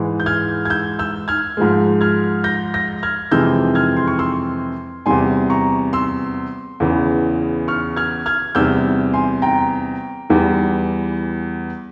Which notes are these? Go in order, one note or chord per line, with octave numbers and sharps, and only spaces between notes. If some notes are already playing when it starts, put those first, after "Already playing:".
Already playing: G#2 E3 G#3
G6
F6 G#6
G#6
E6 G6
E6 G6
F6 G#6
G#2 F3 G#3
F6 G#6
G6 A#6
G6 A#6
F6 G#6
F2 C3 E3 G#3 E6 G6
F6 G#6
C6
C#6
C6 E6
E2 C3 G3 G#5 C6
A#5 C#6
C6 E6
E2 C#3 E3
C#6 F6
F6 G#6
F6 G#6
E2 C3 G3 E6 G6
G#5 C6
G5 A#5
E2 E3 G3